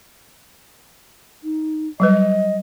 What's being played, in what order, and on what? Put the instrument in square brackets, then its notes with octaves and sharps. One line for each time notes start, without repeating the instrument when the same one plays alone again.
[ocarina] D#4
[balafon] F#3 G3 B4 [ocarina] D#5